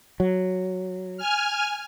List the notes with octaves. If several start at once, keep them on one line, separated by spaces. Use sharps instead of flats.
F#3
G#5 F6